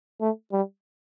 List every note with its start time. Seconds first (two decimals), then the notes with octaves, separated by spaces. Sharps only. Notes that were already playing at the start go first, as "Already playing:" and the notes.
0.21 A3
0.52 G3